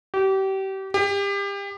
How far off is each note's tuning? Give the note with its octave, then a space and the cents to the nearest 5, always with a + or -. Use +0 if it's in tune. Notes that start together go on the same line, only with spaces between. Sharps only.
G4 -30
G4 +30